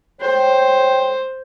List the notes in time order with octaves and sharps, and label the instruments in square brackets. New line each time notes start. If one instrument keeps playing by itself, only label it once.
[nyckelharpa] C5 [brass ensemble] C#5 G5